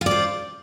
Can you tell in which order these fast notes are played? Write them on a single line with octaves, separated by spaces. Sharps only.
F4 D5 C5